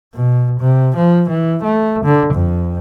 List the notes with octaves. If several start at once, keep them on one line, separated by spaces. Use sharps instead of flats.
B2
C3
F3
E3
A3
D3
F2